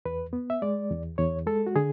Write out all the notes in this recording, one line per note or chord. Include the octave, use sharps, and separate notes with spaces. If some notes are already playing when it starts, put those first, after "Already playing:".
E2 B4
B3
E5
G#3 D5
E2
E2 C#5
G#3 A4
F#4
D3 G#4